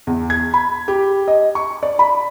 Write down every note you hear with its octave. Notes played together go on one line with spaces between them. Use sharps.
E2
G#6
B5
G4
D#5
C#6
D5
B5